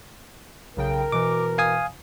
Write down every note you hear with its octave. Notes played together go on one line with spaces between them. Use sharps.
B1 C#3 A#4 G5
B2 E3 D6
F5 G#5 D#6